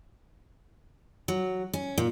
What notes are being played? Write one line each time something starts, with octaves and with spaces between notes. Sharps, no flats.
F#3
C#4
A#2